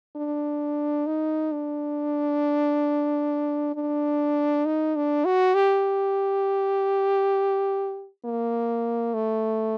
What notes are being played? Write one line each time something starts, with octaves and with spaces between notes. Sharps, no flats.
D4
D#4
D4
D4
D#4
D4
F#4
G4
A#3
A3